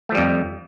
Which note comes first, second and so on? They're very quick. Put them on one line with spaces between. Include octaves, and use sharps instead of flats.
A3 F3 G3 F2